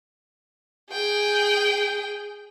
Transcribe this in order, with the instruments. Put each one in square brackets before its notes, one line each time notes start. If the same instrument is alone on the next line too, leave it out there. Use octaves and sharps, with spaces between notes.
[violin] G#4 G5